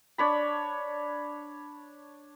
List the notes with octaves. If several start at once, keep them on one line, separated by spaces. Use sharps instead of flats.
D4 C#5 B5